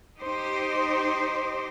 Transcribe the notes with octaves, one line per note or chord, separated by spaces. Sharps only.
D#4 G4 C5